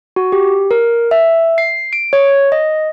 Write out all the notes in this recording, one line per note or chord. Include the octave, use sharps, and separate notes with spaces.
F#4
G4
A#4
E5
C7
D7
C#5
D#5